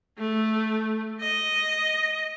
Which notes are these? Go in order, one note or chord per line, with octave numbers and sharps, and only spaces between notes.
A3
D#5